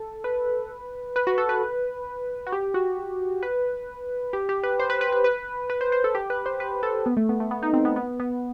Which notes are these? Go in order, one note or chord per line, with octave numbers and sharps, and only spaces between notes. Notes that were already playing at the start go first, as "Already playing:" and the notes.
Already playing: A4
B4
B4
F#4
A4
B4
F#4
G4
F#4
B4
G4
G4
B4
C5
B4
B4
B4
B4
B4
C5
C5
A4
G4
B4
C5
B4
A4
B3
A3
B3
A3
B3
D#4
C4
B3
B3
B3